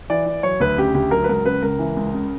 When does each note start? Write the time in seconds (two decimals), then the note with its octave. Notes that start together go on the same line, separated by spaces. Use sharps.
0.10 E3 D5
0.26 E3
0.43 F#3 C#5
0.60 D2 B4
0.78 C#3 G4
0.94 D2 G4
1.11 F#3 A#4
1.24 B4
1.29 C#2 A#4
1.46 C#3 B4
1.63 C#2 A#4
1.79 E3
1.97 C#2
2.14 C#3